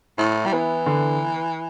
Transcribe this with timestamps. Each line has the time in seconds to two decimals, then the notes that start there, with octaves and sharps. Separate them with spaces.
0.18 A2 E4
0.46 G3
0.53 E3 B3
0.86 D3